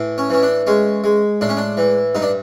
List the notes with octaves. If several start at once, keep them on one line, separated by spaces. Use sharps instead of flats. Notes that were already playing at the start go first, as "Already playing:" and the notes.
Already playing: A2 E3
C#4
E3 C#4
D4
G#3 C#4
G#3
A2 D4
C#4
D4
E3
G2 D#4
D4